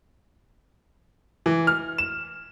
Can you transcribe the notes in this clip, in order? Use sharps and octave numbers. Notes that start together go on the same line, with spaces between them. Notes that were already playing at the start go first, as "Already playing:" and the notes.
E3
F6
E7